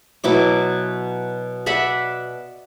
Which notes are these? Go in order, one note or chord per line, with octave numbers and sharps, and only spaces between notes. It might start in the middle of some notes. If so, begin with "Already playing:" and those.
B2 F#3 E4 D6
D5 E5 F#5 B5